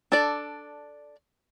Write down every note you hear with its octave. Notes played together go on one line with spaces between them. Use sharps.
D4 A4 D5